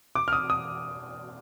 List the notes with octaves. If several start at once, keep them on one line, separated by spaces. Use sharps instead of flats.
D6
F6
D#6
D#6